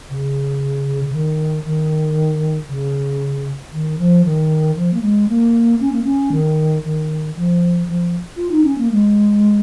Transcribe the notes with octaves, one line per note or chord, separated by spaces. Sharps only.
C#3
C#3
D#3
D#3
C#3
D#3
F3
D#3
F3
A#3
G#3
A#3
C#4
A#3
C#4
D#3
D#3
F3
F3
F4
D#4
C#4
A#3
G#3